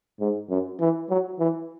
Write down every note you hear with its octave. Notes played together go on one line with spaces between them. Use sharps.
G#2
F#2
E3
F#3
E3